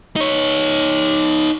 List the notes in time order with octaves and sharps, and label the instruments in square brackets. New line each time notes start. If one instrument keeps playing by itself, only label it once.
[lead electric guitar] D#4 C#5